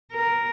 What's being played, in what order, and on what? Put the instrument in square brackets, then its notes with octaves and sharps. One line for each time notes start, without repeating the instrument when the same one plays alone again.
[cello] A#4